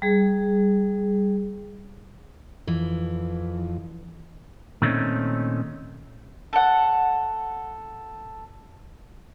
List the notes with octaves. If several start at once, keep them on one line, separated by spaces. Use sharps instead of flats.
G3 G#4
F2 E3
A#2 D#3 A3 C4 C#4 D#4
A4 F#5